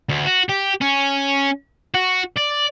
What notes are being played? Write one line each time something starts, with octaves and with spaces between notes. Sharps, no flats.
D2
F#4
G4
C#4
F#4
D5